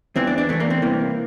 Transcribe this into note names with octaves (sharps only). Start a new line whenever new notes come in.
E2 E3 C4
D4
D4
E2 E3 A3
A#3
C4
C2 C3 E3 A#3